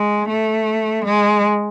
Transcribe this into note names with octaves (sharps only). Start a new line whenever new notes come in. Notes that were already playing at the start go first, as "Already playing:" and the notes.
Already playing: G#3
A3
G#3